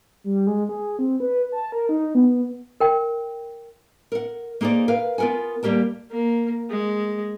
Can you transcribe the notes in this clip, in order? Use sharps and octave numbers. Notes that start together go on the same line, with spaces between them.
G3
G#3
G#4
C4
B4
A5
A#4
D#4
B3
A#4 G5
A#4 F#5
A#3 D#4 G#4 C5 D5
A#4 B4 F5
B3 F4 A#4 F#5 G#5
G3 A#3 G4 A#4 A5
A#3
G#3